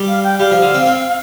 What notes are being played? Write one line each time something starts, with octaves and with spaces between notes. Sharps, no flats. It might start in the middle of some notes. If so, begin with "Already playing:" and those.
Already playing: G3
F5
G5
G3 F5
F3
D3
C4
C4